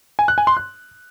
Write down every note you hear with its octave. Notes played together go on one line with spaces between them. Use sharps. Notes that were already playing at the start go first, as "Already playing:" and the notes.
G#5
F#6
G#5
C6
F#6